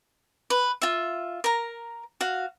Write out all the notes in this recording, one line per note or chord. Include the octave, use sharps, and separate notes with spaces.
B4
F4 E5
A#4 A#5
F#4 F5